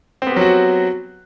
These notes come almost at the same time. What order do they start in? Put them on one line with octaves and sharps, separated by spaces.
C4 B3 G4 F#3 F#4